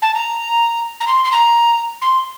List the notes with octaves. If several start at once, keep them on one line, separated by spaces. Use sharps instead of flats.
A5
A#5
A#5
C6
C6
A#5
C6